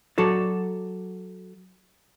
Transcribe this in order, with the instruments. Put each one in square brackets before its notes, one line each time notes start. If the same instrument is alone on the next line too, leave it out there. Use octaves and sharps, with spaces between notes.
[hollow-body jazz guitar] F#3 F#4 A4 D5